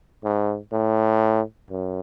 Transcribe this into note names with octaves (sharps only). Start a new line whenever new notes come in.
G#2
A2
F#2